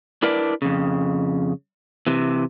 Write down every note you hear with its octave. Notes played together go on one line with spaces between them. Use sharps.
D4 E4 A#4 B4 D5
F2 C#3
C3 E3